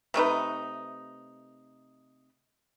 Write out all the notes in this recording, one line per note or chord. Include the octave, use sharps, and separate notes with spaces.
C3 A3 D#4 B4